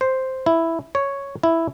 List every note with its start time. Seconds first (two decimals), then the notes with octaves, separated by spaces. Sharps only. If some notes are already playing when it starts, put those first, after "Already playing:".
0.01 C5
0.46 E4
0.95 C#5
1.43 E4